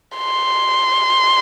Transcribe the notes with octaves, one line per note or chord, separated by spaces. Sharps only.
C6